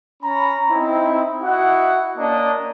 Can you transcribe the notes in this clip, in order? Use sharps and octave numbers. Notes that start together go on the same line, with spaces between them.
C#4 A#5 B5
C4 D#4 E4
E4 F#4 D#5 F#5
A#3 C#4 D4 D5 D#5 A5